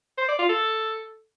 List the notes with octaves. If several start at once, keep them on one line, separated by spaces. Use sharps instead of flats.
C5
D5
F4
A4